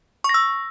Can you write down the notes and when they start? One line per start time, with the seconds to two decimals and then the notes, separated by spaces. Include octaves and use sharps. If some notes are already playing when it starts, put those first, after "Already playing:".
0.24 C#6
0.29 A#6
0.34 E6